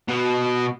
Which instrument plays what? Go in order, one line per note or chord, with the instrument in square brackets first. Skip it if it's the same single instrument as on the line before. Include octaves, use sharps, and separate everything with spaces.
[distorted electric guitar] B2